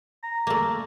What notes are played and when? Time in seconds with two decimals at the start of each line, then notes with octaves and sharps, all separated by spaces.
0.23 A#5
0.47 A3 A#3